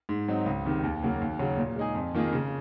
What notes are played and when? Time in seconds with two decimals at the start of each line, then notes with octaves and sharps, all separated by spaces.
0.09 G#2
0.28 F#3 C4 D#4
0.46 C#2
0.65 C3 D#3
0.83 D#2
1.02 C#3 F#3 A#3
1.21 D#2
1.39 C#3 F#3 C#4
1.57 A#2
1.76 G#3 D#4 G#4
1.95 F2
2.14 D#3 A#3 F4 G#4
2.33 C#3